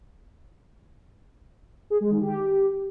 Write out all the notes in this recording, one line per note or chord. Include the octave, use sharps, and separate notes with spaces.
G#4
G#3
D#3
G4